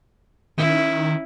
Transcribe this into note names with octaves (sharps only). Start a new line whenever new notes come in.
D#3 C#4 E4